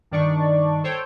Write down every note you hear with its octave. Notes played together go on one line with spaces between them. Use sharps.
G2 D#3 D4 D5 C#6
A4 C5 C#5 G5